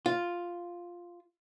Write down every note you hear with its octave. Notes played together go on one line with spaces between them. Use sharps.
F4